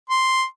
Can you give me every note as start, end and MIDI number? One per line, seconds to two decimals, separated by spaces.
0.10 0.44 84